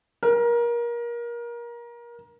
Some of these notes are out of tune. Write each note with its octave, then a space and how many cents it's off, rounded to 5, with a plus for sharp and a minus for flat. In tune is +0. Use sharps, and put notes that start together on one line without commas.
A#4 +25